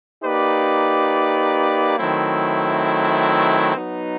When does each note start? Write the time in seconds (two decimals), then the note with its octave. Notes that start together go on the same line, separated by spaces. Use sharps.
0.23 A#3 D#4 G4 B4 D5
1.99 D#3 F#3 A3 C4 E4
3.75 F#3 B3 D#4